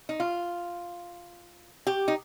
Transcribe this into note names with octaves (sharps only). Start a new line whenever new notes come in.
D#4
F4
G4
D#4